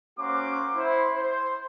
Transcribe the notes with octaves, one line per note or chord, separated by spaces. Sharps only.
A#3 C#4 F#4 C5 C6 D6
E4 C5
C5